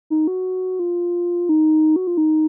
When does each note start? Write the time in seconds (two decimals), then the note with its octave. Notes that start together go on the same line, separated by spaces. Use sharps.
0.10 D#4
0.27 F#4
0.79 F4
1.49 D#4
1.96 F#4
2.07 F4
2.17 D#4